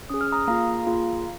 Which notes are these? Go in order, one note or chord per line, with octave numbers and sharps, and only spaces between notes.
C#4 G#4 D#6
F6
A#5 D#6
A#3 F4 G#4 F5 A#5
A#3 F4 G#4